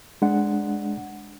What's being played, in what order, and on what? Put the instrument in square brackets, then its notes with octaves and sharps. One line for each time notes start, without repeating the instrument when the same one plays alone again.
[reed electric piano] G#3 D4 F#5